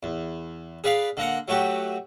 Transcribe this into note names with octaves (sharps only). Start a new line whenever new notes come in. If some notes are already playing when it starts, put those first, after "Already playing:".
E2
G#4 B4 D5 F5
D3 A#3 A#4 F#5
F#3 A3 F#4 G4